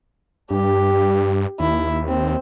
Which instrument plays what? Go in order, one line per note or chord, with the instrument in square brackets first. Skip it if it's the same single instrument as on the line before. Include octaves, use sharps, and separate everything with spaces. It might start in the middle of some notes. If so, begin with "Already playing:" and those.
[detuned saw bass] G2 [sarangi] G4
[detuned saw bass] D#2 [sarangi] E4
[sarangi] C4